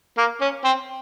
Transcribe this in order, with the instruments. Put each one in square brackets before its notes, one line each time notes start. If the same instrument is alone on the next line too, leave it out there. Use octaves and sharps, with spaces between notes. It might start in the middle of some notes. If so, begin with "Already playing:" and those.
[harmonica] A#3
C#4
C4